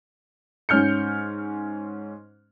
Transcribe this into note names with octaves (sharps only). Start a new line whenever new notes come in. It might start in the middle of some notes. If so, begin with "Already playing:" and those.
G#2 C#4 F6 G6 C#7